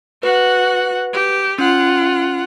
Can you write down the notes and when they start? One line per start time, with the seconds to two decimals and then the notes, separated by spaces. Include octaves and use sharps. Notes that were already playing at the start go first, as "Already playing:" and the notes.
0.23 F#4 B4 F#5
1.13 G4
1.59 C#4 F4 F#5